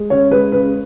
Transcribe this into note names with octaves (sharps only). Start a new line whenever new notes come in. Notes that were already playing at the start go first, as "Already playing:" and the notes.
Already playing: G#3
C#3 C#5
G#3 B4
C#3 B4